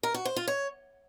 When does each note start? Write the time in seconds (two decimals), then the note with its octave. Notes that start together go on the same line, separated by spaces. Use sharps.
0.03 A#4
0.14 F#4
0.25 C5
0.36 F4
0.47 C#5